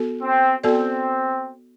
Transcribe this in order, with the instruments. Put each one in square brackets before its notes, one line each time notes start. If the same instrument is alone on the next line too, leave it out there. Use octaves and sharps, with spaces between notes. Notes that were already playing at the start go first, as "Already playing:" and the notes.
Already playing: [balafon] B3 F#4 A4
[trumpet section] C4
[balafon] B3 F#4 A4 D5 [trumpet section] C4